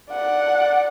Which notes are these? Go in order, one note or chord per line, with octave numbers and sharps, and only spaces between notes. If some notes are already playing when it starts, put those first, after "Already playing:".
D5 F#5